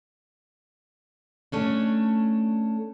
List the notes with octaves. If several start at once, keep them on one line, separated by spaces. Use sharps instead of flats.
A3 C#4 D4